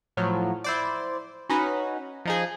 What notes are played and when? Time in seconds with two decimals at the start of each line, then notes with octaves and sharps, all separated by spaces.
0.17 A2 F3 F#3
0.64 E4 C5 D5
1.49 C#4 D#4 F#4 B4
2.25 F3 D#4 G#4